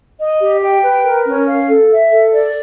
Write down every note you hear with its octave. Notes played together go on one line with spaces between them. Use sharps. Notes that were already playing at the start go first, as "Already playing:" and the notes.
D#5
G4
G5
B4
A#4
C#4
F5
A4
E5
A4
D5